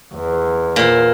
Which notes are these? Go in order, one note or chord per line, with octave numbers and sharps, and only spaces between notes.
E2
A#2 C5